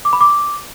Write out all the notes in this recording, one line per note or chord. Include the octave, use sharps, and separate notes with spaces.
D6
B5
D6